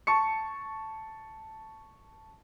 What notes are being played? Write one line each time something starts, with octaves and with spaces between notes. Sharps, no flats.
A5 C#6 C#7